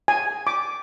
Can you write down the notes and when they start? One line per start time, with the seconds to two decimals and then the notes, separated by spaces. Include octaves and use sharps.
0.08 G#5
0.47 D6